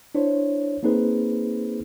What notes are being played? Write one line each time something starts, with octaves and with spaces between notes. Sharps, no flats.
D4 E4 C5 C#5
A#3 C4 D#4 G#4 B4 C5